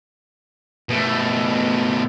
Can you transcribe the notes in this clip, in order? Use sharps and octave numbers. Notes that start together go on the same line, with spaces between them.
B2 A3